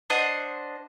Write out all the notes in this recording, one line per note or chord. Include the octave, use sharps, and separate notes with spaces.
D4 C5 D#5 F#5